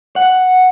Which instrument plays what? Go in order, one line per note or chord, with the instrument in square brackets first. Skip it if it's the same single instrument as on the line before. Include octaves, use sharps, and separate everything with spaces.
[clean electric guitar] F#5